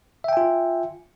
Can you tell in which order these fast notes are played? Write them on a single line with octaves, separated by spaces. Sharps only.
E5 G5 G#5 F4